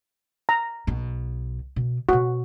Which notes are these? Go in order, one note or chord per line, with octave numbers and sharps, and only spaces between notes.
A#5
B1 B2
B2
B2 B3 F#4